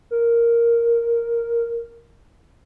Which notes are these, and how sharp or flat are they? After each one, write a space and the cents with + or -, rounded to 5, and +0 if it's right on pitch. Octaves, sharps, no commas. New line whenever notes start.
A#4 +0